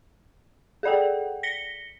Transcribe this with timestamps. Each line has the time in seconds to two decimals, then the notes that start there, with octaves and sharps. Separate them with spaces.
0.83 G#4 A4 D5 F#5 G5
1.43 A#6 B6 C#7 G7